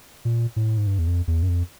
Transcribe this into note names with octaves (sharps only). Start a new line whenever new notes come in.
A#2
A2
G#2
G2
E2
F2
E2
F#2
F2